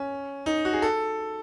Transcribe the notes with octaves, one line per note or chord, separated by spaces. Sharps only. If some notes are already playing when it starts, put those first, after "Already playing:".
Already playing: C#4
D#4
F#4
G#4
A4